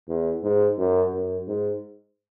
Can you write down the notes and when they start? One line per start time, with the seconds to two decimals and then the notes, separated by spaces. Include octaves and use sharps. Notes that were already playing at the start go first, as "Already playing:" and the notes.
0.08 E2
0.43 G#2
0.78 F#2
1.13 F#2
1.47 G#2